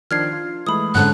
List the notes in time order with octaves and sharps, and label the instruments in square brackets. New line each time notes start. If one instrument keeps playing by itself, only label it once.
[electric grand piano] D#3 F3 D4 [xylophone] F6 G#6 C7
[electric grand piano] F4
[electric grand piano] E3 G#3 A3 [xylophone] B5 D#6
[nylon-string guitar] G#2 D3 C#4 [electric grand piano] F#5 A5 [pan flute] F#6